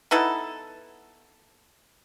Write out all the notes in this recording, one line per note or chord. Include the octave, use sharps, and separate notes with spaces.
B3 D#4 E4 A4